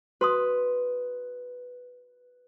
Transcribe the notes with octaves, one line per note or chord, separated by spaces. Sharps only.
F#4 B4 C6 D#6